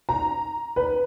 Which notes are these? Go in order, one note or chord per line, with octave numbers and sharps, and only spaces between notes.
A#5
B4